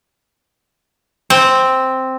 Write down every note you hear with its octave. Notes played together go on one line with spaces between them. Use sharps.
C4